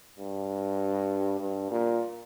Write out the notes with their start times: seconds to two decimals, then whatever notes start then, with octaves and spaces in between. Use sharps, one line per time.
0.19 G2
1.40 G2
1.71 A#2